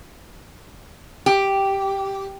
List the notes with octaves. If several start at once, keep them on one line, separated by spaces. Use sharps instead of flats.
G4